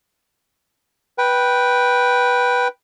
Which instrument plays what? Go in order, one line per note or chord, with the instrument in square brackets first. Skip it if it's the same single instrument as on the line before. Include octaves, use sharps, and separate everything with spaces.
[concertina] B4 G5